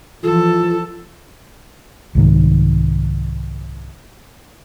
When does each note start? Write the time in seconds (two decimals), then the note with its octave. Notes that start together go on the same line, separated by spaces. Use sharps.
0.23 E3 F3 F4 A4
2.15 C2 G#2 D#3